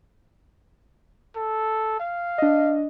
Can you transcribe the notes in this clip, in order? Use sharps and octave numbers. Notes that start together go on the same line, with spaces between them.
A4
F5
D4 D#5